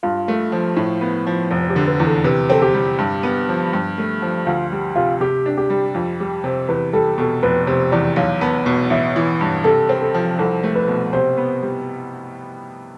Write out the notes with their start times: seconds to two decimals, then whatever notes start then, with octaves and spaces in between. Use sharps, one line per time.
0.03 G2 F4
0.28 A3
0.52 F3
0.77 A2
1.01 B3
1.27 F3
1.51 F1
1.70 G4
1.76 D3
1.88 B4
2.00 E2
2.06 A4
2.24 C3 B4
2.50 C4 A4
2.62 G4
2.74 G3
2.98 G2
3.23 B3
3.49 F3
3.73 G2
3.98 A3
4.22 F3
4.47 D2 F4
4.72 G3
4.96 C3 F4
5.20 C3 G4
5.46 D4
5.57 G4
5.70 G3
5.94 F2 F4
6.20 G3 G4
6.44 C3 C5
6.69 E2 B4
6.93 G3 A4
7.18 B2 A4
7.43 F1 B4
7.67 C3 C5
7.92 E2 D5
8.16 B1 F5
8.41 B3 A5
8.66 B2
8.90 A1 E5
9.16 E3
9.41 G2
9.64 C3 A4
9.89 C4
10.01 A4
10.14 F3
10.39 C2 A4
10.63 A3
10.75 B4
10.87 B2
11.13 C3 C5
11.38 B3
11.62 G3